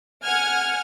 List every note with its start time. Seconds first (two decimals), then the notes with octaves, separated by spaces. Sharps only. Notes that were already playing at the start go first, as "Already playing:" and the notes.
0.25 F#5 G#5 F6 G#6